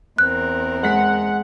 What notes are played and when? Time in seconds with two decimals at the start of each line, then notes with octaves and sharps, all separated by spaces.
0.18 E2 C4 A#4 F#6
0.83 G#3 F#5 B6